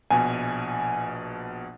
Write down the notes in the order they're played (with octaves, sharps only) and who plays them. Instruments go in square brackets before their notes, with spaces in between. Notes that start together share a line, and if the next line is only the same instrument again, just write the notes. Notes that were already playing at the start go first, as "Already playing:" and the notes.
[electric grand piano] A#1 B2 [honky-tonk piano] G#5